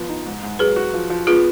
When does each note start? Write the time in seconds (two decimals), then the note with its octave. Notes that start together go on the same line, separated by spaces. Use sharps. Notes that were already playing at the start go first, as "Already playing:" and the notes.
Already playing: F3 B3
0.09 D#4
0.26 G#2
0.43 G#2
0.59 F#3 G#4 B4
0.76 F#4
0.94 F3
1.10 F3
1.27 B3 F4 G#4